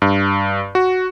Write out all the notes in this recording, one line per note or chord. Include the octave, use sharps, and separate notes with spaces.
G2
F#4